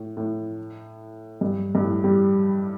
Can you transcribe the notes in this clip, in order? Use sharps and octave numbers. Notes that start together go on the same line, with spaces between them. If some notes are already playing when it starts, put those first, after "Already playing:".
Already playing: A2
A2
G2
G2
A2
G3